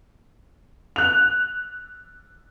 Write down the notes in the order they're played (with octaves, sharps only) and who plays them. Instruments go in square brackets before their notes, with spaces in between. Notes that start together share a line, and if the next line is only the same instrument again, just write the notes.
[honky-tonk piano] F#6 F7